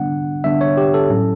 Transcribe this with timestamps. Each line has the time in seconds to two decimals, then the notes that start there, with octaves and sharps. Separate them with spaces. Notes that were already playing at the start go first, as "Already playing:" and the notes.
Already playing: D3 G3 B3 D4 F#5
0.44 D3 G3 B3 D4 E5
0.61 C#5
0.77 G4
0.94 A4
1.10 A2 F#3 C#4